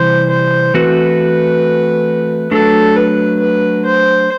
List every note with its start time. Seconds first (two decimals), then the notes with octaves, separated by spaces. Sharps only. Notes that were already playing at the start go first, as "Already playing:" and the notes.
Already playing: C3 E3 G3 C5
0.31 C5
0.74 E3 A3 C4 F#4 B4
2.51 F#3 A3 D4 A4
2.97 B4
3.40 B4
3.85 C5